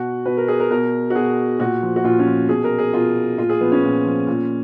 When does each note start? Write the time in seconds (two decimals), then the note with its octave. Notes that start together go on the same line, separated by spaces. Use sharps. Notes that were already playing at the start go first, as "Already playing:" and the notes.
Already playing: B2 F#4
0.26 B2 B4
0.37 A#4
0.48 G#4
0.60 A#4
0.70 B2 A#4
1.10 F#4
1.15 B2 G#4
1.59 A#2 F#4
1.83 F3
1.96 F#4
2.04 A#2 F4
2.19 C#4
2.26 F3
2.49 B2 G#4
2.64 A#4
2.79 G#4
2.93 B2 F4
3.38 A#2 F4
3.49 G#4
3.61 F3 B3
3.72 C#4
3.83 A#2
4.05 F3
4.27 A#2